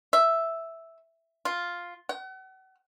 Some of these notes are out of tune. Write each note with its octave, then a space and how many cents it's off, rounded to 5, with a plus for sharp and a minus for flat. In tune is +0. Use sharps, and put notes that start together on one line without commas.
E5 +0
F4 +0
F#5 +40